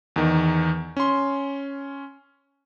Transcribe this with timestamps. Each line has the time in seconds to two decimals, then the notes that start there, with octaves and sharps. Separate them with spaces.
0.16 E2 D#3
0.97 C#4 C6